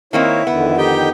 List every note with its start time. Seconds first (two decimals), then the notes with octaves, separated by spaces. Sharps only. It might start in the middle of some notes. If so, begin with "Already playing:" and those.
0.13 D#3 A#3 C4 E4 C#5 E5
0.47 F2 D3 D#3 B3
0.78 D#4 G4 G5